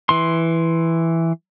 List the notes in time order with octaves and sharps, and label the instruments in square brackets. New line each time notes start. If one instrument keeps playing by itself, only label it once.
[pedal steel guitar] E3 C6